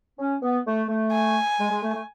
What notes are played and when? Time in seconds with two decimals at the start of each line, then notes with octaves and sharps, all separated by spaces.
0.19 C#4
0.42 B3
0.66 A3
0.89 A3
1.12 G#5
1.59 G#3
1.70 G#3
1.82 A3
1.94 A3